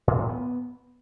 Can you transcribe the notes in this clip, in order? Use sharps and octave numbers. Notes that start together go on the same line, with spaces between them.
A2
A2
B3